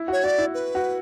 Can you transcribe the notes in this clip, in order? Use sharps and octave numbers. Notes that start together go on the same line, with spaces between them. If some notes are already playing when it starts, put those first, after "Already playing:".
Already playing: E4
F#4 C#5
F#4 D5
E4
B4
F#4